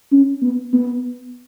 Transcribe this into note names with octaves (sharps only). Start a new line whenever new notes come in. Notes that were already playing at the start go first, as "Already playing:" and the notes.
C#4
B3
B3